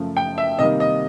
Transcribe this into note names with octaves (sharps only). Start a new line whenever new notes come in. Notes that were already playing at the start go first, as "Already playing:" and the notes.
Already playing: F#2 C#3 F3 A3
G5
E5
C3 D#3 G3 A#3 D#5
D#5